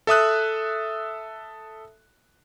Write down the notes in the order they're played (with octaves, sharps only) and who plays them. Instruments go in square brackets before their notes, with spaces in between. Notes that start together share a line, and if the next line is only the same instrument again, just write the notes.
[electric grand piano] A4 E5 D#6 F#6